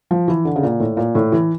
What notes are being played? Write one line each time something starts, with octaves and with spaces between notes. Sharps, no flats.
F3
E3
D3
C#3
A#2
A2
A#2
A2
E3